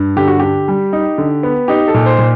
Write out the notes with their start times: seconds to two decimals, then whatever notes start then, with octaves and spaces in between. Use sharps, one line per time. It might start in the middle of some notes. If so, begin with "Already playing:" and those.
Already playing: G2
0.16 D3 G4
0.28 F#4
0.39 D3 G4
0.68 G3
0.93 D#4
1.18 D3
1.43 B3
1.68 D#4 G4
1.88 A4
1.94 A#2
2.06 C5
2.19 A#2